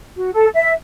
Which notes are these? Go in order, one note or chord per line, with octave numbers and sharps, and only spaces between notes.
F#4
A4
E5